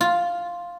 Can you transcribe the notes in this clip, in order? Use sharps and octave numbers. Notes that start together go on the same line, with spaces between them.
F4